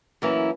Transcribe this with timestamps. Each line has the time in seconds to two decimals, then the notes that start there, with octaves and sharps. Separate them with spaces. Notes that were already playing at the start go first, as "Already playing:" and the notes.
0.22 F#2 E3 A#3 C#4 E4